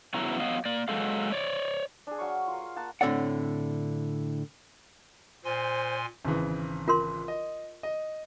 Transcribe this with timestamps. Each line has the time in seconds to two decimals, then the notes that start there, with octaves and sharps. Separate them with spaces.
0.14 G2 C#3 F#3 B3 E4 A#5
0.40 F#3 B3 D#5 F5
0.65 A#3 D5
0.88 F#3 G#3 A4 F5
1.32 C#5 D5
2.07 D4 G#4
2.18 F#3 F5 C#6
2.47 F4 A#4
2.62 F5
2.76 A#3 F#5 A5
3.01 A2 D3 C4 C#5 D5 F#5
5.45 A#2 C5 G#5 C6
6.25 G#1 C#3 E3
6.88 F4 A#4 C6
7.28 D#5
7.83 D#5